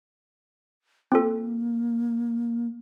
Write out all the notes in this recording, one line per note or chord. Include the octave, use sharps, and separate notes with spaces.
A#3 C4 F4 A4